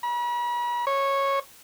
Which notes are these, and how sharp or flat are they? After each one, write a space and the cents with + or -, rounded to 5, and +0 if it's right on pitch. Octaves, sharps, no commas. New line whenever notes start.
B5 -45
C#5 -10